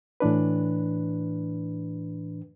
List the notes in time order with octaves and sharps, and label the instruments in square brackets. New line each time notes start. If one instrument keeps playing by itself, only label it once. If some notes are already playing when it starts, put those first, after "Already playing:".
[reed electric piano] A2 E3 D4 B4